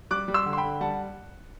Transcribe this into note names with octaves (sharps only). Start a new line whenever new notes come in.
G3 D6 F#6
G3
C6 E6
D3
C6
G5 B5
D3
G3 F#5 A5